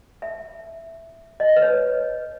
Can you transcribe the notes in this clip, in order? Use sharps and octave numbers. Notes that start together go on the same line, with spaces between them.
E5
D#5
B4
C#5